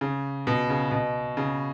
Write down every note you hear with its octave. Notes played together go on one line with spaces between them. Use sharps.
C#3
B2
C#3
B2
C#3